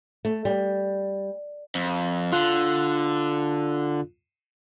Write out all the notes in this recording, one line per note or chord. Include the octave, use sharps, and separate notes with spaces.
A3
G3
F2
D3 F4 F#6